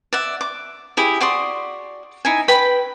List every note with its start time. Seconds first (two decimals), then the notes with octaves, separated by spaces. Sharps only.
0.13 D5 E5 F#5
0.41 D6
0.97 E4 G4 G#4
1.20 F#4 D5 C6 D#6
2.25 D#4 E4 G#5
2.48 B4 G5 B5